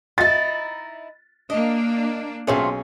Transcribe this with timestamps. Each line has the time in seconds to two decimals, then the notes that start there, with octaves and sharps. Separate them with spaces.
0.18 D#4 E4 A6
1.50 A#3 D4 D#5
2.47 B1 A3 C4 C#4 F4 G#4